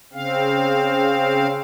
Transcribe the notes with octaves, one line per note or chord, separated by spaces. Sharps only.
C#3 C4 F5